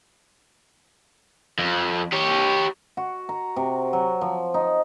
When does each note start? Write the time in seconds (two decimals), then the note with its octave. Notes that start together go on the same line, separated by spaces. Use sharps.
1.59 F2
2.13 G4 C#5
2.97 F#4
3.29 A#5
3.56 C3
3.93 F#3
4.21 F3
4.54 D#4